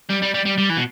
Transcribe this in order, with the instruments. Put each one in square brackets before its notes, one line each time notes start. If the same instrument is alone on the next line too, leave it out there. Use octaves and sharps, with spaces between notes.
[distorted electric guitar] G3
G3
G3
G3
G3
E3
B2